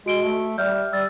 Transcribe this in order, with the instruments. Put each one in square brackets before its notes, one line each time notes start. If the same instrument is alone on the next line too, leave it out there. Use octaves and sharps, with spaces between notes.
[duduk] G#3 [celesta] F#4 D7 G7
[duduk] A3
[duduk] G3 [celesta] E5 F6 G6
[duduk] G3 [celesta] E6 A6